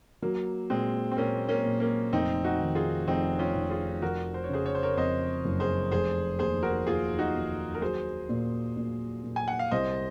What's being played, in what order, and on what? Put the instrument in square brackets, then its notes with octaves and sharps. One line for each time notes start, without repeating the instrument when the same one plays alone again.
[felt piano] F#3 [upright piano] A#3
[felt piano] A#2 [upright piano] G#3 C4
[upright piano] C4
[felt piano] A#2 [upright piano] A#3 C#4
[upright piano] A#3 C#4
[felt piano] A#2
[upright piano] A#3 C#4
[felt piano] F1 [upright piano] C4 D#4
[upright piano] D#4 F#4
[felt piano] D#3
[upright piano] F4 G#4
[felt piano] F1 [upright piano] C4 D#4
[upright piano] C#4 F4
[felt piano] F1
[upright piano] F4 G#4
[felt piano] F3 [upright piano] F#4 A#4
[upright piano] C5
C#5
[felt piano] C#3 [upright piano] G#4 C5
[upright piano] C#5
C5
A#4 C#5
[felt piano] F2 [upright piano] C5 D#5
[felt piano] F#1
[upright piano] G#4 C5
[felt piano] F1 [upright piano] G#4 C5
[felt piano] D#2 [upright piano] G#4 C5
[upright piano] F#4 A#4
[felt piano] D#2 [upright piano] F4 G#4
[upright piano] D#4 F#4
[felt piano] D#2
[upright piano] A#4
[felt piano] F#3 [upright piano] G#4 C5
[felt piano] A#2
A#2
A#2
[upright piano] G#5
F#5
F5
[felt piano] C2 [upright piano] C5 D#5